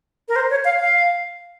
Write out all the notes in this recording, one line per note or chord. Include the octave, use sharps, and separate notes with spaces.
A#4
C5
C#5
F5
F5